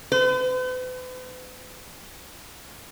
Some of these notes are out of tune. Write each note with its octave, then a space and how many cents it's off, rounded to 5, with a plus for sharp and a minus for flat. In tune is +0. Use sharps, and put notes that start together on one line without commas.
B4 +45